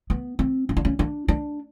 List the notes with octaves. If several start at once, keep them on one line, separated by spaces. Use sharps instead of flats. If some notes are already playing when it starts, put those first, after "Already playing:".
B3
C4
C#4
D4
C#4
D4
D4